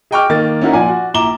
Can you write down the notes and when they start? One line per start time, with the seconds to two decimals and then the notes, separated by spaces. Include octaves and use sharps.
0.11 G#4 D#5 G5 C#6 D6 F6
0.30 D#3 A#3 D#5 A6
0.61 C#4 D#4 E4 F#4 A#4
0.73 A#2 F3 D5 F#5 G#5
0.89 F#4
1.14 A#1 E4 A#5 D6 E7 G7